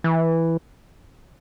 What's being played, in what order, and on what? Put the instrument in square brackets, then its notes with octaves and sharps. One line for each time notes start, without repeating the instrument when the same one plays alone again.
[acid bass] E3